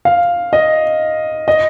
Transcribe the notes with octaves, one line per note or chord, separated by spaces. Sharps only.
F5
D#5
D#5